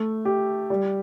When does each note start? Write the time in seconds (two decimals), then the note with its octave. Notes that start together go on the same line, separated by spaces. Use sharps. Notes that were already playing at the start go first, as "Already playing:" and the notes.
Already playing: A3
0.25 G4
0.70 G3